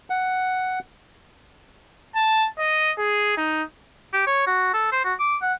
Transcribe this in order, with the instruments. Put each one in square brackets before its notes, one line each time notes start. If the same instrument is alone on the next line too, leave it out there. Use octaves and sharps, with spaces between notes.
[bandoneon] F#5
[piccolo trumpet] A5
D#5
G#4
D#4
[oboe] G4
C#5
F#4
A4
C5
F#4
D6
F#5